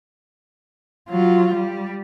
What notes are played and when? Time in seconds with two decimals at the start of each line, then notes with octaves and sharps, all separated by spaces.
1.10 F#3 F4
1.54 G3